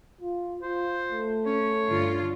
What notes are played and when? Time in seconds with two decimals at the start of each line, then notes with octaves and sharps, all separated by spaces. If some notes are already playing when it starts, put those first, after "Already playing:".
0.21 F4
0.62 F4 C5
1.11 A3
1.46 C#4 C#5
1.87 G2 D3 F4